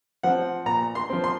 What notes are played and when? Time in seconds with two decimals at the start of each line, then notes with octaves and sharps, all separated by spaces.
0.23 F3 C4 F#5
0.66 A#2 A#5
0.95 C6
1.10 F3 C4
1.24 C6